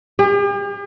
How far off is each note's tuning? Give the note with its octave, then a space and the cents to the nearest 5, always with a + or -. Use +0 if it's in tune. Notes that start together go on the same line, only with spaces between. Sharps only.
G4 +45